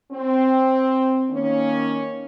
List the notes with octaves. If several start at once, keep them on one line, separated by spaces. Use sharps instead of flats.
C4
D#3 A#3 C#4